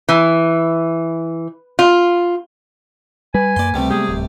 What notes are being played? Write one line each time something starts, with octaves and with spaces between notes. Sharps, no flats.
E3
F4
G3 B4 G#5
F#2 A#3 D5 C6
C#2 C3 G3 A3 A#3 C4
G#3 B3 C4 G4 G#4
D1